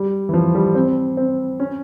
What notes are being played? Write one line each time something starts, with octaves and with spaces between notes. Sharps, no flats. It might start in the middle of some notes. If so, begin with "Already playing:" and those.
Already playing: G3
E3
F3
G3
C4
C4
C#4